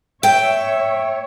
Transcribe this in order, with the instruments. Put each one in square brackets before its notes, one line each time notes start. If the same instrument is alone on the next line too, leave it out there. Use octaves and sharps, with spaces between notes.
[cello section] C#5 [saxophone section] E5 [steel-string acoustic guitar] G5